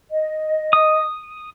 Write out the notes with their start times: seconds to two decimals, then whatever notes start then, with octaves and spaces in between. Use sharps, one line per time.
0.10 D#5
0.73 D#6